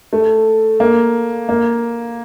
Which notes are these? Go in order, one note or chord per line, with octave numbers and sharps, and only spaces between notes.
A3
A#3
A#3